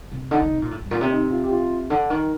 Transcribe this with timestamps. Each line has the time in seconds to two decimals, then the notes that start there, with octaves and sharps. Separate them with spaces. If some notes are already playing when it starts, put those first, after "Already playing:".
0.12 C3
0.31 D3 D#4
0.42 D3
0.52 C3
0.62 A#2
0.71 A2
0.81 G2
0.91 A#2
1.01 C3
1.11 D#4
1.31 F4
1.44 G4
1.50 F4
1.90 D3
2.10 D#3